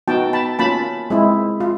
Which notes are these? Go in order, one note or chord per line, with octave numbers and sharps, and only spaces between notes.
B3 D#4 F#4 G5 A5
A5 B5
A#3 C#4 F4 A5 B5
G#3 C4 E4
F4